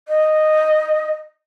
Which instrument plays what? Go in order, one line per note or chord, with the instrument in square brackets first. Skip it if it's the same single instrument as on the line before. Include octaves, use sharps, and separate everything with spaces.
[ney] D#5